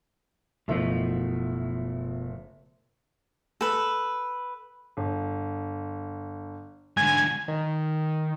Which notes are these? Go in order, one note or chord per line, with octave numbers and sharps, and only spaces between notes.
F#1 B2 F3 A3 E5
A4 B4
G1
G#2 D3 G#5 G#6
D#3